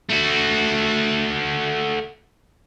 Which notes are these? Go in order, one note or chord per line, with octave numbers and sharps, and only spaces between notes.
A3 F#4